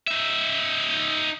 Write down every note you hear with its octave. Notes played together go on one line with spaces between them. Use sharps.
D#4 E5